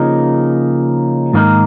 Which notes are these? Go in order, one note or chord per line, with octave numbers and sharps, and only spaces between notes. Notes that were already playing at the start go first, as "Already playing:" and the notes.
Already playing: C#3 F3 A#3 D#4
G#2 D#3 A#3 D#4 A#4